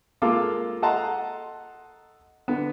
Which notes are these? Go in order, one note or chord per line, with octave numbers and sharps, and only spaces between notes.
G#3 A#3 F4 A4 D6
A4 D#5 F#5 A5 A#5 C6
D3 B3